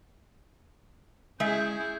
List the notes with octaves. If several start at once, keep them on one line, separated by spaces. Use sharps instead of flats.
G#3 C#4 E4 G#4 E5 G6